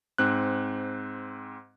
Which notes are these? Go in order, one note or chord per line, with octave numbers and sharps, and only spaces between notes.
G#2 C4 F#6